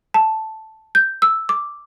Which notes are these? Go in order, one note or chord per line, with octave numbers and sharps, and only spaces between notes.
A5
G6
E6
D6